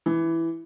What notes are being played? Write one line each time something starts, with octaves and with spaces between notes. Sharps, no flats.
E3